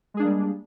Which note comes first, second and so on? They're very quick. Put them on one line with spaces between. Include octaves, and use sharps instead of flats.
G#3 G#4 D4 A#3 G3